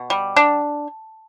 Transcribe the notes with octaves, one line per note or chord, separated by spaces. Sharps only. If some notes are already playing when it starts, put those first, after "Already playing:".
Already playing: B2
G3
D4